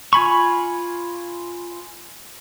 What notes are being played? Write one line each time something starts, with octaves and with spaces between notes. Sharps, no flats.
F4 G#5 B5 C#6